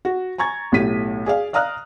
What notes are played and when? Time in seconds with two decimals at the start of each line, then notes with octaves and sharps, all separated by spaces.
0.05 F#4
0.38 G#5 A#5 C#6 G#6 A6
0.72 B1 A2 G4 B6 D#7
1.26 G#4 D5 F5
1.53 D5 F5 A#5 D#6 F6 F#6